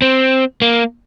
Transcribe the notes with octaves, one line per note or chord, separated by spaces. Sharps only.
C4
A#3